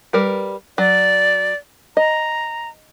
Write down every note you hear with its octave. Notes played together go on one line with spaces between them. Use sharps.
G3 A#4 B4
F#3 D5
D#5 A#5